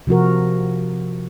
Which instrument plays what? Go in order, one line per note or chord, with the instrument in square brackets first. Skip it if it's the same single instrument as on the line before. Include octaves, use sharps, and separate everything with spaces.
[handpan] C3 F3 F#4 A#4